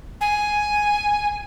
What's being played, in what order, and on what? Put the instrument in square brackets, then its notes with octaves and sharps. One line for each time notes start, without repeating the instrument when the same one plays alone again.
[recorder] G#5